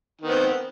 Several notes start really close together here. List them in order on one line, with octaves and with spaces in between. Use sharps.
D#3 B3 C4